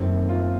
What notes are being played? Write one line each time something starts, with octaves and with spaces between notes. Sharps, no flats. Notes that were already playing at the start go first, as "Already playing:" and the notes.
Already playing: F#1 F#2 D#3 A3 C4 A4
F4